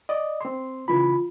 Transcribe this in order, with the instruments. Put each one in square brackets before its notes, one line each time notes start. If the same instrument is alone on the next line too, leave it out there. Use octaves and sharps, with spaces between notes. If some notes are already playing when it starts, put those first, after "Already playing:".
[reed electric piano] D5 D#5
C4 C6
[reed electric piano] C#3 E3 B5 [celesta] F4